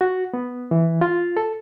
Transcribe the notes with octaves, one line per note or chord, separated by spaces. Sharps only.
F#4
B3
E3
F4
A4